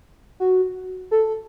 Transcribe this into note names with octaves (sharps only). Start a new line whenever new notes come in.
F#4
A4